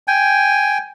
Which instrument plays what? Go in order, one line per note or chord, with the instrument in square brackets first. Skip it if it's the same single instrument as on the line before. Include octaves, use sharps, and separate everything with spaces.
[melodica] G5 G#5